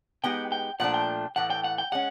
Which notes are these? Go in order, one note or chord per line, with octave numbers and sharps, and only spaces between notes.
G#3 B3 D#4 G4 G5
G5
A#2 F3 A3 D4 F#5
G5
A2 E3 A3 F#5
G5
F#5
G5
G#3 C#4 F#5